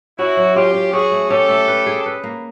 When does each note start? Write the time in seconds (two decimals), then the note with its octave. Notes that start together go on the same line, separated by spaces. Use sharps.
0.18 C#4 E4 F#4
0.37 F#3
0.55 C#4 F4 G4
0.74 C#4
0.93 C#4 F#4 G#4
1.11 A3
1.30 C#4 G4 A4
1.49 A3
1.68 B4
1.86 G#4
2.06 B4
2.24 A#3